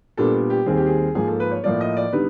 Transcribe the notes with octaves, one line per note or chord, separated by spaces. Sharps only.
A#2 G3 B3 D4 A4
G4
D#2 D#3 G3 C4 G#4
G4
G#4
G#2 F3 A#3 G#4
A4
B4
C#5
A2 F3 A#3 D5
D#5
D5
D3 G3 B3 D#4 B4